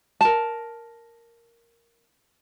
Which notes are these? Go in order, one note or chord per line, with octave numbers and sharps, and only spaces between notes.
A#4 A5